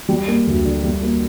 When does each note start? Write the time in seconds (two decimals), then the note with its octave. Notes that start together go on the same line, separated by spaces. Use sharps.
0.09 G3
0.28 A#3
0.47 D2
0.65 D3
0.84 G3
1.02 A#3